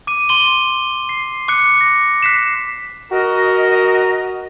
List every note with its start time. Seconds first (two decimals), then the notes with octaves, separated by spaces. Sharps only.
0.07 D6 D#7
0.29 C6 D#7 G7
1.09 C7
1.48 D6 F#6 C#7
1.81 A#6
2.23 F#6 B6 C7 E7
3.12 F#4 A#4 D#5